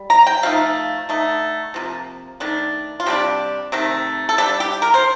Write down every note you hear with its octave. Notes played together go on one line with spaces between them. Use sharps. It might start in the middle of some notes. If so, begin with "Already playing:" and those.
Already playing: G3
A#5
G5
F3 A3 D#4 F5
D3 A3 D#4
C3 F3 A#3
D#3 A3 D4
F4
C3 G3 D4 G4
C3 D#3 A3
A4
G3 D4 G4
G4
A#4
C5